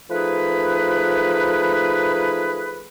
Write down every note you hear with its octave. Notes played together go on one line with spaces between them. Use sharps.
F3 A3 D#4 G#4 B4